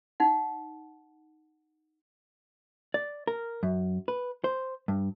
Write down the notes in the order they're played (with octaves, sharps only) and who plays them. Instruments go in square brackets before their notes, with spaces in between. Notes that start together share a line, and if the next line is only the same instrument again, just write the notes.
[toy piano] D#4 F#5
[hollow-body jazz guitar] D5
A#4
F#2
B4
C5
G2